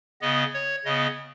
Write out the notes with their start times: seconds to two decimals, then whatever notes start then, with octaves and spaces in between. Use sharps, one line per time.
0.21 C#3 B3 D#5
0.54 C#5
0.85 C#3 B3 D#5